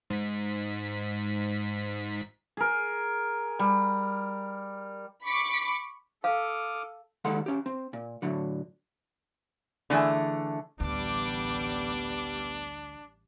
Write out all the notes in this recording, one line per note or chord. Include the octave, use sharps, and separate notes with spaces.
G#2 B6
G#4 A#4
G3
B5 C#6 D6 B6
A4 F5 D6 D#6 F6
D#2 G#3 A4 F#5 C6
C#4 G4
C4
A#2
A2 D3 F#3
D3 E3 A3 G#4 E5
A1 D2 G3 B3 D4 D6